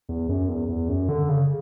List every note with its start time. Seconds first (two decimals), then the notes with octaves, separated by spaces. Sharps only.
0.09 E2
0.29 F#2
0.49 E2
0.68 E2
0.89 F#2
1.09 D3
1.29 C#3